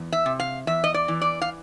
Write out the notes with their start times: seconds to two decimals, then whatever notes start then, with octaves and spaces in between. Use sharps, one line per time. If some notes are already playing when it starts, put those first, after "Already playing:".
Already playing: E2
0.12 E5
0.26 C3
0.40 F5
0.67 E2 E5
0.84 D#5
0.94 D5
1.08 E3
1.22 D5
1.42 F5